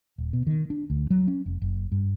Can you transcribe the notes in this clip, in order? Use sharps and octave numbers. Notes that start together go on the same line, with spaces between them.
D#1
B2
D#3
D4
D2
F#3
C#4
F1
F#1
G2